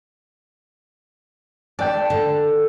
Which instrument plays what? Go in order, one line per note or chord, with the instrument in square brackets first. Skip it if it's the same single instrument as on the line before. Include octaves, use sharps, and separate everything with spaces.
[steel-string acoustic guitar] D5 [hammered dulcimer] G5 A5
[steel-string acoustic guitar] D3